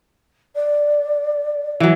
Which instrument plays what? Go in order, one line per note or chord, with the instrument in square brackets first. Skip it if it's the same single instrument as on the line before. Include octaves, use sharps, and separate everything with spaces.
[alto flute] D5
[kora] E3 F#3